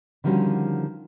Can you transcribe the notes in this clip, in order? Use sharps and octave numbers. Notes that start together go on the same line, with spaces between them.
D3 D#3 F3 G3 C#4 F#4